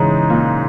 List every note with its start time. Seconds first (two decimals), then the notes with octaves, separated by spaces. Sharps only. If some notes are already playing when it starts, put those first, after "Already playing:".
Already playing: G#2 C#3 E3 G#3 D#4
0.30 A#2